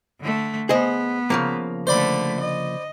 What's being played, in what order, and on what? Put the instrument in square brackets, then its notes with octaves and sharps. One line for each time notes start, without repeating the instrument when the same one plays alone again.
[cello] D3 A3
[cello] B3 [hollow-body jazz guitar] G#4 C5 D#5
[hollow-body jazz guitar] C#3 F3 A#3
[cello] D3 A3 [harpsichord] C5 D5 B5
[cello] D#5